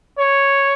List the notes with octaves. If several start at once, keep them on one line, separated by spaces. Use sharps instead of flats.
C#5